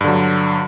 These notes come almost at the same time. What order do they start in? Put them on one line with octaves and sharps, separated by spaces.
G2 D3 F#3